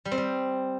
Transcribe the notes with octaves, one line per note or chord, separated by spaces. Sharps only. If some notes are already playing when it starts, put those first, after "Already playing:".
G3
C4
G3